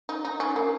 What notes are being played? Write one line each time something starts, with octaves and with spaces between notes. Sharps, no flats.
D#4
D#4
C#4
A#3